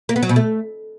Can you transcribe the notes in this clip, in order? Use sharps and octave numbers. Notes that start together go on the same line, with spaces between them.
A#3
B3
F#3
B2
A3